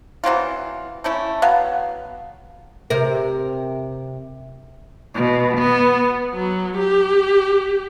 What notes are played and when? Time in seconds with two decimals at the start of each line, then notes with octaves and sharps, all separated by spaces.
0.24 E3 F#3 C4 F4
1.04 A3 C#4 E4
1.42 F#3 B3 F5
2.90 C3 A#4
5.13 B2
5.58 B3
6.34 F#3
6.78 G4